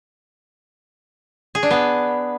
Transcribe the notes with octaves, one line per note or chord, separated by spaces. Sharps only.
G#4
D4
B3